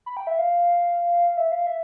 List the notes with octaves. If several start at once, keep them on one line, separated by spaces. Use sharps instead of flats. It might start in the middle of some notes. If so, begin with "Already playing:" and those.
B5
G5
E5
F5
E5
F5
E5